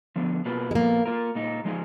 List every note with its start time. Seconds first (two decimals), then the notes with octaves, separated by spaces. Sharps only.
0.16 D3 F3 B3
0.45 B2 A#3 F4 G#4 B4
0.71 G#3
0.75 A#2 F3 A#3 B3
1.06 A#3 F4 A#4
1.35 A#2 G#3 D#4
1.65 F3 G#3 D#4 G#4